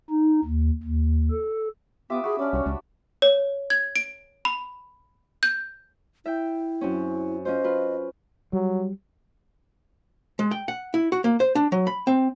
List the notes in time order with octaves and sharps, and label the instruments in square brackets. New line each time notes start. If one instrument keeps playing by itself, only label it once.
[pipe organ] D#4
D#2
D#2
A4
[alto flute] B3 [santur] F4 G4 [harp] E5 D6 D#6
[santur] F#4 B5 [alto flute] G#4
[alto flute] C#4 [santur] D4 D5
[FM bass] C2 [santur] F#4 C#5
[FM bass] C#2 [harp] D4
[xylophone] C#5
G#6
D7
B5
G6
[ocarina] E4 [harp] E5 G5
[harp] F#2 C4 C#4
[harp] C#4 F4 C5 [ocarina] D#5
[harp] F4 B4
[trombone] F#3 [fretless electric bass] G3
[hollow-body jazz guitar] G#3
G5
F#5
E4
F#4
A#3
C5
D4
F#3
B5
C4